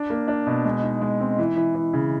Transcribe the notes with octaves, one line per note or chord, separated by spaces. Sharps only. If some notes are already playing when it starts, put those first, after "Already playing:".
Already playing: D4
A#3
D4
B2
G#3
D#4
G#3
C4
E3
E3
E3
C#3